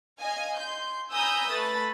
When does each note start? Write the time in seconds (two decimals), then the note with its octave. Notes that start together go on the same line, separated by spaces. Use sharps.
0.20 D#5 F5 G#5
0.59 C6 G6
1.12 G#5 A#5 B5 D#6 E6 G6
1.50 A3 B4 B5 A6